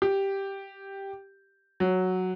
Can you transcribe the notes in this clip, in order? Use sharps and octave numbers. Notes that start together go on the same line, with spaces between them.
G4
F#3